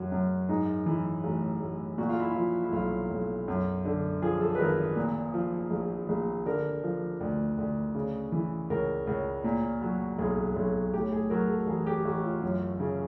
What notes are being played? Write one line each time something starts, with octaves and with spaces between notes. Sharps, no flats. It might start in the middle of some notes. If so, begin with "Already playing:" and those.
Already playing: F#2 F#3
F#2
G#2 D#4
E3
A1
A1
A#2 F#4
F4
E4
F3 F4
E4
B1 F4
B1
F#2
D3
F3 G#4
A4
B4
G#1 A#4
A#2
F3
A#1
A#1
D3 A#4
F3
D2
D2
C#3
E3
C#2 A#4
C#2
A#2
F#3
B1 G#4
B1
A2 G4
G#4
F#3 A#4
A4
A1 G#4
G4
A1 F#4
F4
F#2
C#3